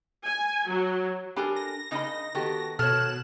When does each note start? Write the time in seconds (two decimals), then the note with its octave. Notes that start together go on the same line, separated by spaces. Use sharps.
0.25 G#5
0.67 F#3
1.36 D4 G4 A4 A#4 G#5 B5
1.56 A#6
1.91 C#3 D4 D#4 A#4 D#5 B5
2.35 D#3 B3 F#4 G4 A4
2.79 B2 A4 C#5 F6 F#6 E7